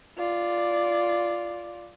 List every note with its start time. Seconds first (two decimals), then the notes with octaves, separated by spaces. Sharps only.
0.17 F4 D5